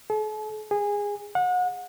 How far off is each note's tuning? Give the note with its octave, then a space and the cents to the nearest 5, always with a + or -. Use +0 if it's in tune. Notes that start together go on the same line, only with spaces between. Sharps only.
A4 -45
G#4 -20
F#5 -35